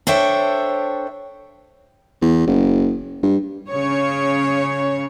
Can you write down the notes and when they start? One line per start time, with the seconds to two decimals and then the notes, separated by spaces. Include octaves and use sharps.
0.07 D4 A4 C5 C#5 E5 G5
2.22 E2
2.47 F#1
3.23 G2
3.70 C#3 C#5